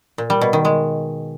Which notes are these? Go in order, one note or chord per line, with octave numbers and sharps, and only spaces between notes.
A#2
G3
B2
D#3
G#3